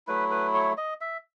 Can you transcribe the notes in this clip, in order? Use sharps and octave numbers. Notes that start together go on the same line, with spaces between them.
F#3 A3 E4 B4
B4
C#5
D#5
E5